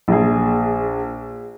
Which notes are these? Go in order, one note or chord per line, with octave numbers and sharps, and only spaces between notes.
A#1 G#4